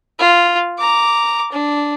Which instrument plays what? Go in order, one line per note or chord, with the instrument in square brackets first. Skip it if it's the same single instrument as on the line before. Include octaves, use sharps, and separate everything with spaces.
[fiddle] F4
A#5 D6
D4